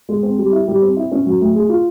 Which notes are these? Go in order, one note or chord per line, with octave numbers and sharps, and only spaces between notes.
G#3
C4
G3
E4
G3
C4
E4
C#4
F#3
A3
G#4
F4